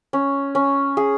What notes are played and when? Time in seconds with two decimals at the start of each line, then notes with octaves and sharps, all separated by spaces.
0.13 C#4
0.55 C#4
0.97 G#4